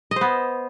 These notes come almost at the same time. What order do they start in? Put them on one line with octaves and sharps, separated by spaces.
D#5 C5 B3